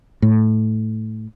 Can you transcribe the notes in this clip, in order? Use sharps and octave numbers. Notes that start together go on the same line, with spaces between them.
A2